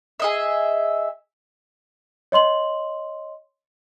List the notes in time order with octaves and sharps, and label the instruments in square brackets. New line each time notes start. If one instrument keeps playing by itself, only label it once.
[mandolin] G#4 D#5 E5
[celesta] C#5 D#5 C6 F#7